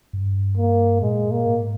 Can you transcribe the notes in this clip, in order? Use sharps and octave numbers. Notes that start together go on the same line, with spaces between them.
G2
A#3
A#2 G#3
A#3
G#2